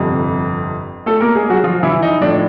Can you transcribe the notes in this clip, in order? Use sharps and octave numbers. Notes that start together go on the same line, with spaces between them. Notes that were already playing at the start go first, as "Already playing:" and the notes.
Already playing: G1 F2 C3
A3 A4
A#3 A#4
G#3 G#4
F#3 F#4
F3 F4
E3 E4
D#4
A2 F3 D4